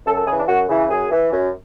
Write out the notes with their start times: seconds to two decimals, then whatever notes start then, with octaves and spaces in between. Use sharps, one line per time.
0.06 F#2 A4
0.17 A4
0.27 C#3 E3 G#4
0.38 D4
0.48 F#2 F#4
0.69 C#3 E3
0.90 F#2 G#4
1.11 E3
1.32 F#2